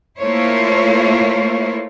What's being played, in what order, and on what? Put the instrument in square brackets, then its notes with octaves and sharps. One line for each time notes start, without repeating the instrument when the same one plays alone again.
[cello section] A3 A#3 E4 F4 C5 C#5